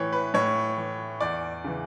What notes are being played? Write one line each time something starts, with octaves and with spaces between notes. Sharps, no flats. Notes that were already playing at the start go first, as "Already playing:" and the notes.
Already playing: A2 E3 C#5
B4
A2 C#5
E3
E2 D5
C#3 E3